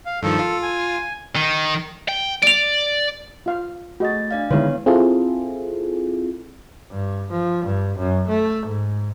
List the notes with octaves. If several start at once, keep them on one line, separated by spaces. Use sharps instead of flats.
F5
G2 D#3 F3 A4
F4
G#5
D#3
G5
D5 D7 F7
F4 F5
A3 F#4 G#4 D#5 A6
D4 D5 F5
D3 D#3 G#3 B3 E4 B4 C#5
C4 E4 F4 G#4 A4
G2
F3
G2
F#2
A3
G#2